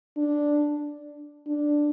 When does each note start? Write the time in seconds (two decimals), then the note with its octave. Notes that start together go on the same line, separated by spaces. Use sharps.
0.17 D4
1.47 D4